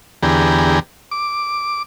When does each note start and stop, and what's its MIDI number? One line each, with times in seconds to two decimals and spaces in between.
0.23 0.79 40
0.23 0.79 50
0.23 0.79 59
0.23 0.79 67
0.23 0.79 68
0.23 0.79 82
1.11 1.83 86